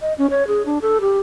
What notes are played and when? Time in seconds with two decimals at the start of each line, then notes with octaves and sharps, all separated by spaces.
0.02 D#5
0.18 C#4
0.30 C#5
0.47 G#4
0.66 D4
0.82 A4
1.01 G4